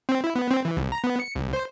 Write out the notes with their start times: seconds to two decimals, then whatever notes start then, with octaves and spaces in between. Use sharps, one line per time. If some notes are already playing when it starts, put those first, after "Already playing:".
0.09 C4
0.24 E4
0.36 B3
0.51 C4
0.65 E3
0.77 C2
0.92 A#5
1.04 B3
1.20 C#7
1.35 C2
1.53 C5